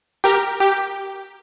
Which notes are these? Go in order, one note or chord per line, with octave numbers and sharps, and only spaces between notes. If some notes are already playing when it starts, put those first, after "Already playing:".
G4 A#4
G4